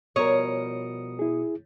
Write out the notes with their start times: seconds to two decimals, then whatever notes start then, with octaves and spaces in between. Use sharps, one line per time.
0.16 B2 F3 G3 A#4 C#5 D#6 C#7
1.19 E4 G#4